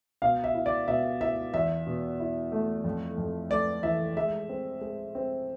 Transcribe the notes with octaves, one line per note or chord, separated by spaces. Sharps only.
B2 F5
E5
E4
D5
B2 E5
E4 E5
E2 E5
B2
E4
A3
F2
F2
A3 D5
E3 E5
G#3 E5
C4
G#3
C4